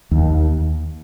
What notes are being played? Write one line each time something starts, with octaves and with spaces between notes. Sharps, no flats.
D#2